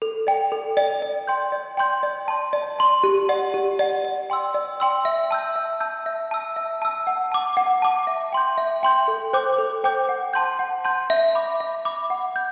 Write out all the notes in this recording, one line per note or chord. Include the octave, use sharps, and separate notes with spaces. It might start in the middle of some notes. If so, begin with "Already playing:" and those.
A4
D5 G5
A4
D5 G5
D5
G5 C6 G6
D5
G5 C6 G6
D5
A5 C6
D5
A5 C6
G4
D5 F#5
G4
D5 F#5
D5
G5 C6 E6
D5
G5 C6 E6
E5
A5 E6 G6
E5
A5 E6 G6
E5
A5 E6
E5
A5 E6
F#5
A5 D6
F#5
A5 D6
E5
G5 C6 G6
E5
G5 C6 G6
A4
C5 G5 D6 G6
A4
C5 G5 D6 G6
F#5
A5 C6 G6
F#5
A5 C6 G6
E5
B5 D6
E5
B5 D6
F#5
G6